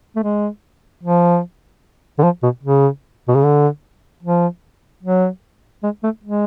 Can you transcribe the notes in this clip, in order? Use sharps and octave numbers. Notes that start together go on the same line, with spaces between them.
A3
G#3
F3
D3
F3
B2
C#3
B2
C#3
D3
F3
F#3
G#3
A3
G#3